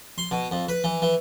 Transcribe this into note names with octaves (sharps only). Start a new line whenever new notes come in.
C6
B2
F2
B4
E3
E3